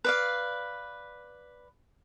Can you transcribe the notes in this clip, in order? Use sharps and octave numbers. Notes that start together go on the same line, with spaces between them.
B4 D5 F5